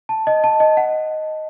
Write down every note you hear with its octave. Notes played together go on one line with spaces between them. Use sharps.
A5
D#5
A5
D#5
F#5